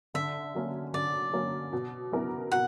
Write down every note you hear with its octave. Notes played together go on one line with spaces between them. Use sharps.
D3 E5
F#3 A#3 C#4
D3 D5
F#3 A#3 C#4
B2
F#3 B3 E4 A#4
B2 F#5